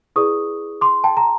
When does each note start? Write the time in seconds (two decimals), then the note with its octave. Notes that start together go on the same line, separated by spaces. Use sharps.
0.16 E4 G#4 B4 D5 C#6 D#6
0.81 C6 D6
1.04 G5 A5
1.17 A#5